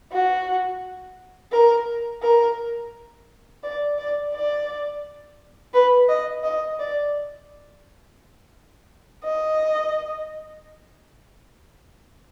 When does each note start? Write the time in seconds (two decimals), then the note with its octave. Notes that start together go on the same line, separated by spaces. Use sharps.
0.12 F#4
1.52 A#4
2.22 A#4
3.63 D5
3.98 D5
4.34 D5
5.74 B4
6.09 D#5
6.43 D#5
6.79 D5
9.24 D#5